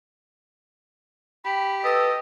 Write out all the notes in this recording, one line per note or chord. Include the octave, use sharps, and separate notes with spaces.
G4 B5
A4 B4 D#5 E6